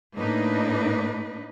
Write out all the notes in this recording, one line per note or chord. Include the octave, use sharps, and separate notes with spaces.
A2 A#3 D4 D#4 B4